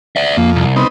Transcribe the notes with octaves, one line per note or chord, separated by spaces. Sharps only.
D5 E5
F2 A#3
C2
B3 C4 D#4